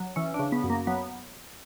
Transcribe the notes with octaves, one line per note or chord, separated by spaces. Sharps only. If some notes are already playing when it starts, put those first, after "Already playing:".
Already playing: F#3
E3 C#4
D4
C#3
B3
F#2
A#3
F#3 B3